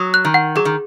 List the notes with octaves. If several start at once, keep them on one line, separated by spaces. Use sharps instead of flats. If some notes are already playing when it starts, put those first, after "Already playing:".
Already playing: F#3 D#6
F#6
D#3
F#5
F#3 G#4
D#3